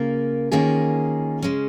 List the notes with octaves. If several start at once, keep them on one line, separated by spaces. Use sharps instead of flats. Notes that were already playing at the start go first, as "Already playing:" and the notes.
Already playing: C#3 A#3 F4 A#4
D#3 A#3 C#4 F4 G#4
C#3 G#3 C#4